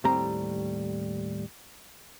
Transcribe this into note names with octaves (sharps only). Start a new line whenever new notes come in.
D#2 A2 G3 C4 A#5